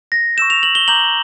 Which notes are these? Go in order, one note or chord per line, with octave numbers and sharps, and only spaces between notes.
A#6
C#6 E6 G6 E7
F7
F#7
G7
A#5 D6 G6 F#7